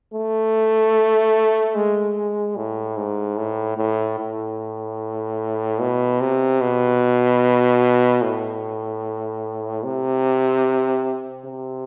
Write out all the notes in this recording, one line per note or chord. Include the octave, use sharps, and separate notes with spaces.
A3
G#3
A2
G#2
A2
A2
A2
B2
C3
B2
A2
C3
C3